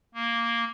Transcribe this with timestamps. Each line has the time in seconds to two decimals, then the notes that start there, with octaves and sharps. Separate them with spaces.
0.15 A#3